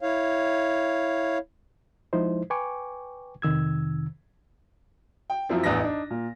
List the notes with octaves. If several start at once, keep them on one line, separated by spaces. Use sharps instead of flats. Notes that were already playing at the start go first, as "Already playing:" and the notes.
E4 C#5 F5
F3 G#3 D#4 E4 C5
B4 G5 G#5 C#6 D6
F2 C3 D#3 E6 G#6
G5
F#2 F3 C4 E4
A1 E2 E3 D4 B4 A#6
D4 D#4
A#2